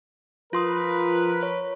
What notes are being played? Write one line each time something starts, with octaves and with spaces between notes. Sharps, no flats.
F3 F4 A#4 B4 C6 D#6
C#5